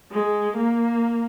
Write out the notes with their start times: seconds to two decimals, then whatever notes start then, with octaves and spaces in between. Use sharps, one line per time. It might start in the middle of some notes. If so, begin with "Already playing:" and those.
0.11 G#3
0.56 A#3